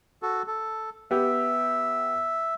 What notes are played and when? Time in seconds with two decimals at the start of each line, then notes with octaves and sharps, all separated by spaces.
0.22 F#4 A4
0.48 A4
1.11 B3 G4 E5